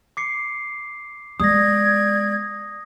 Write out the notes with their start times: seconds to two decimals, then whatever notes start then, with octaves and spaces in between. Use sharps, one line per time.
0.17 D6 C7 C#7
1.40 G#3 B3 D5 D#6 G6 G#6 A#6